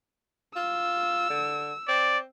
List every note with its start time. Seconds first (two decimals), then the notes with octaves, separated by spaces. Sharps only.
0.56 F4 E6
1.29 D3
1.88 C4 D5